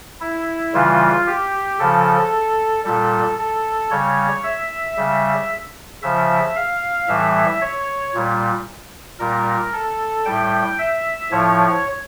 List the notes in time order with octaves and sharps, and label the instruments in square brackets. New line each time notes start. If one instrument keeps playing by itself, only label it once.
[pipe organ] E4
C#3 E3 G3 F4
G4
C#3 F3 A4
A#2 G3 A4
A4
C#3 G3 C#5
E5
C#3 G3
C#3 F3 E5
F5
A2 E3 G3 E5
C#5
A#2 G3
A#2 G3 A#4
A4
A2 G3 G5
E5
A2 F3 C#5